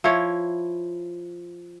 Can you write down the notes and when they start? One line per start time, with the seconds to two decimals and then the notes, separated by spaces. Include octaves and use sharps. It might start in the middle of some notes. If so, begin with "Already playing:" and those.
0.04 F3 E4 C#5